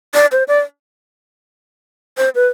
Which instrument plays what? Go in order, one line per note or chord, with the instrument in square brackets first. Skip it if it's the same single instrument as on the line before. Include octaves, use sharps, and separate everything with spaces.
[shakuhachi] D5
C5
D5
C5
B4